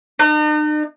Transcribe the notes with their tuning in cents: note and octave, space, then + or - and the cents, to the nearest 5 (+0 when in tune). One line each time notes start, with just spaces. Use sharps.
D#4 -45